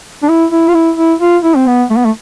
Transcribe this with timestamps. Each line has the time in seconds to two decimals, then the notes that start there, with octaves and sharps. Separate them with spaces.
0.23 D4
0.29 E4
0.52 E4
0.68 F4
0.74 E4
0.97 E4
1.21 F4
1.44 E4
1.56 C4
1.67 B3
1.90 A3
1.97 B3
2.05 A3